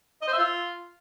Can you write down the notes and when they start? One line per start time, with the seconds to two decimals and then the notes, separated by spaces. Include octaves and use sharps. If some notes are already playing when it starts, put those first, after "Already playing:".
0.22 D#5
0.28 C5
0.33 E5
0.38 F4